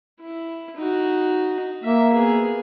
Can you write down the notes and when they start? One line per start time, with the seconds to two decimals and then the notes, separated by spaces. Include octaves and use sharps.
0.21 E4
0.77 D#4 F#4
1.84 A#3 E5
2.12 B3 G#4